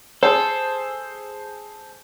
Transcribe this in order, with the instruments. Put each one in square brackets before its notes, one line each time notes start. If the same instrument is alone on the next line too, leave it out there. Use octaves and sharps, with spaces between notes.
[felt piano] G#4 C5 [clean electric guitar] A4